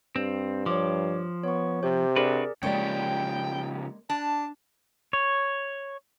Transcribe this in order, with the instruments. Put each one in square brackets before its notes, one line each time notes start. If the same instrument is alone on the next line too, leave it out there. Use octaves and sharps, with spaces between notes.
[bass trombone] G2 [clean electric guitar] C4
[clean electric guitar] F3 [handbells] C#5 D6
[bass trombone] B3 [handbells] C#5 C#6
[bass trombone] C3 [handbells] G4 C5
[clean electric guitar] D4 F#4 B4 [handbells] G#4 A#4 D5
[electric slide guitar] C#3 F3 G4 [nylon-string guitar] G#3 A#3 D5 [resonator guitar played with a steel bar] C#5 [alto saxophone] G5
[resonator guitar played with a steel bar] D4 [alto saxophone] A5
[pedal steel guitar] C#5